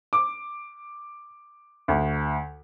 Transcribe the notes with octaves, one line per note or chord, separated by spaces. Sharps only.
D6
D2